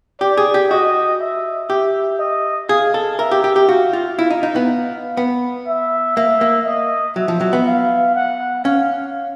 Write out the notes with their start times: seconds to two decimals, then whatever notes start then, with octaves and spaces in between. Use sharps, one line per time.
0.21 G4 D5
0.38 G#4
0.54 G4
0.71 F#4 D#5
1.20 E5
1.70 G4 E5
2.19 D#5
2.69 G#4 F5
2.94 A4
3.19 A#4 E5
3.32 G4
3.44 G4
3.56 G4
3.68 F#4 F5
3.93 F4
4.19 E4 F5
4.30 D#4
4.43 D#4
4.56 B3
5.17 B3
5.67 E5
6.17 A#3 E5
6.41 A#3
6.67 D#5
7.16 F#3 E5
7.28 F3
7.41 F#3
7.53 B3
7.66 F5
8.15 F#5
8.65 C#4 F5